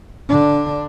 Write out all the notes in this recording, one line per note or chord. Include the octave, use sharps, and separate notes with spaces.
D3 D4